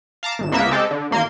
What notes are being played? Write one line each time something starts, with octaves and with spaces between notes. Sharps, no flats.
F5 A5 A#5 D6
G#1 E7
C#2 A#3 B3 E5 E6
G#3 C4 G4 A4
D3
A1 A#3 C6 G#6